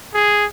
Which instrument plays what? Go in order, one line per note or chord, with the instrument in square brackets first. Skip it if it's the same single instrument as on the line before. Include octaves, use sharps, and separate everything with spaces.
[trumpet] G#4